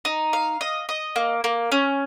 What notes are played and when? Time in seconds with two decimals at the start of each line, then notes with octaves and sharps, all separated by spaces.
0.05 D#4
0.33 F5
0.61 D#5
0.89 D#5
1.16 A#3
1.44 A#3
1.72 C#4